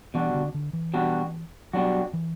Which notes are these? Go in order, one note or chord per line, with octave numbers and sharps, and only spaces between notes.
B2 E3 G3 D4 F#4
D3
D3
E3
B2 G3 D4 F#4
B2 F#3 G3 D4 F#4
E3